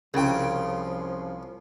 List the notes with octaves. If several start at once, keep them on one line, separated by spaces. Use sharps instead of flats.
C2 C#3 F3 F4 G5